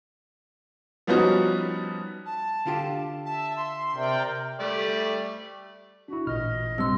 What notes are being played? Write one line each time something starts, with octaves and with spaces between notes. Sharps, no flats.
F3 G3 B3 C#4 D#4 F#4
A5
D3 F4 G4
E5 A5
C6
C3 A#4 D5 G5
G3 A3 D5
D4 E4 F#4
A1 A#2 D#5 F6
C2 G2 C3 C6 E6